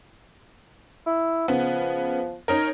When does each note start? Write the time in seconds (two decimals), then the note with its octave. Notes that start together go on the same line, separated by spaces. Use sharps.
1.06 E4
1.48 C#3 F3 B3
2.48 C#4 D#4 A#4